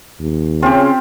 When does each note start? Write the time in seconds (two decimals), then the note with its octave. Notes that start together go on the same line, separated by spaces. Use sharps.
0.20 D#2
0.62 C#3 C4 C#4 F4 G4